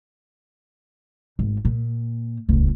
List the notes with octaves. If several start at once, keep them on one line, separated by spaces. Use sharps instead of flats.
G#1
A#2
D#1 C#2